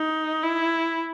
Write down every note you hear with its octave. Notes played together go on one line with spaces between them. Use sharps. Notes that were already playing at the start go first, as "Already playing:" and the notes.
Already playing: D#4
E4